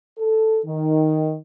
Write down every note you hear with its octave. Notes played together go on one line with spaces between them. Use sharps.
A4
D#3